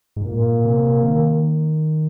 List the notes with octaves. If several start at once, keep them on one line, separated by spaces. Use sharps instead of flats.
G#2
A#2 A#3
C3
D#3